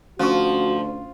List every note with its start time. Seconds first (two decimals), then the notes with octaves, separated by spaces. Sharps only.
0.19 D2 F3 C#4 F#4 C#6